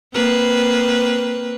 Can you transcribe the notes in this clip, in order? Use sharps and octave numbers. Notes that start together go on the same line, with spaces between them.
A#3 C4 B4